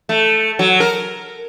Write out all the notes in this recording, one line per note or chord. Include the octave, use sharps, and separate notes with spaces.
A3
F#3
A#4